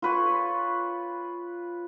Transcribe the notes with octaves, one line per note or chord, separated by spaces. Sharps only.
F4 B4 C#5